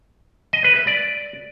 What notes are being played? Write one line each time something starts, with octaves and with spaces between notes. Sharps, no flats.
D#5
B4
E5
D5